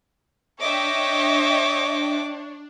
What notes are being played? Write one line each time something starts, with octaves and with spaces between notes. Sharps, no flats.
D4 C#5 D#5 E5 G5 D6